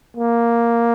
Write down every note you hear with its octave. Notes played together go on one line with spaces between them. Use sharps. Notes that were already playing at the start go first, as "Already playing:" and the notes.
A#3